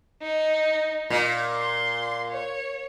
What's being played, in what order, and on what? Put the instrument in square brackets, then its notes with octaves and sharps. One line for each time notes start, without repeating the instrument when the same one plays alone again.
[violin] D#4
[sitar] A#2
[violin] C6
C#5